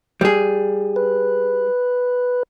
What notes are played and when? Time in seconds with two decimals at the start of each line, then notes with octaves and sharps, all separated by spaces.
0.21 G3 G#4
0.96 B4